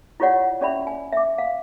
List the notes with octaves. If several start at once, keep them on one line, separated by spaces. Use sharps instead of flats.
E4 F4 G4 C#5 D5 F#5
C#4 G4 D5 E5 B5
G#5
E5 D6
F5